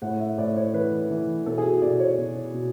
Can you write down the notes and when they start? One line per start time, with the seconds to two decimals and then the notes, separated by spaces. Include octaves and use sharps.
0.02 A2 F#5
0.20 E5
0.38 A2 D5
0.56 C#5
0.74 E3 B4
1.10 E3
1.46 B2 A4
1.58 G#4
1.64 F#4
1.82 B2 D5
2.00 C#5
2.18 B2
2.54 B2